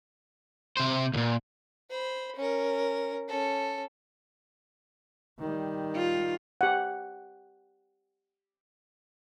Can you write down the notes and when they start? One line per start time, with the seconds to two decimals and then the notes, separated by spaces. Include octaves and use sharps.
0.77 C3 C5
1.14 D2 A#2
1.90 C5 B5
2.36 C#4 A#4
3.28 C#4 A4
5.39 D#3 G3
5.95 F4
6.61 G4 F#5